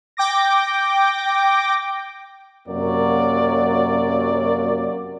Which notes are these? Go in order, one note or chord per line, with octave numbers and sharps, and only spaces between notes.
G5 D6 A#6
F#2 C3 F#3 A#3 D5